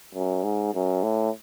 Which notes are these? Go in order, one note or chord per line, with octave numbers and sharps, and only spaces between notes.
F#2
G#2
F#2
A2